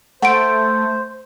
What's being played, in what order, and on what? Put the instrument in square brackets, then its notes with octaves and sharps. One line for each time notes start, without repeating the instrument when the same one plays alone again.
[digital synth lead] A3 [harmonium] C5 [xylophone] F#5 D7